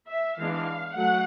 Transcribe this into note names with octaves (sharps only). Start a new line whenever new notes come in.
E5
E3 G#3 B3 D4 F5
F#3 A3 F#5